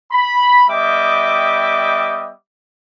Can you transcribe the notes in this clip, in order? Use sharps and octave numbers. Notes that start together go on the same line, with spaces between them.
B5
G3 B3 D#5 E5 G5 D6